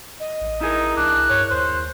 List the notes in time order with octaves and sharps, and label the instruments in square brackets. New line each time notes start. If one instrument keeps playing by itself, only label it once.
[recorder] D#5
[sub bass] A1
[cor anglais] D#4 [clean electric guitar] E4 G#4 A#4
[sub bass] C2 [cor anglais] D4 [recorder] F#6
[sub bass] G2 [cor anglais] C#5
[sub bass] D#2 [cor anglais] C5